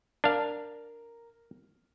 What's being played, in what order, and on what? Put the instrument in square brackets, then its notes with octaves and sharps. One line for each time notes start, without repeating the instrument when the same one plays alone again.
[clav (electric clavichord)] D4 F5 [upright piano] A#4